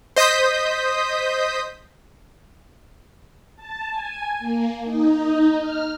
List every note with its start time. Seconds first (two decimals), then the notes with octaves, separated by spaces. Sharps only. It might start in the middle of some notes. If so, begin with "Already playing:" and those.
0.16 C5 D#5 D#6 G6 B6
3.56 A5
3.91 G#5
4.39 A#3
4.84 D#4
5.60 F6